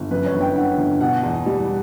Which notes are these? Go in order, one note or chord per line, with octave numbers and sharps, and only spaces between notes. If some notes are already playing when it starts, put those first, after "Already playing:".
Already playing: G1
F#2 B4
C#5
G1
G5
D3 F#5
G1
B2 F#5
E2
G3